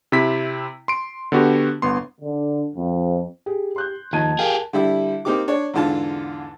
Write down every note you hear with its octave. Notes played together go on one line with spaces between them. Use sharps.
C3 C4 E4 B6
C6 D7
D3 B3 F#4 G4
G1 B3 C6
D3
F2
G4 G#4
C6 F#6 G6
D#2 F3 D#4 D#5 A5 G#6 D#7
G4 G#4 A#4 F5 G5
D3 G3 E4
A#3 C4 D#4 G4 D6
D4 C#5
E2 G#2 D3 F4 A5